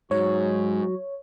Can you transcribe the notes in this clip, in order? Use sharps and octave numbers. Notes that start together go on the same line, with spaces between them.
G#2 F#3 F#4 C#5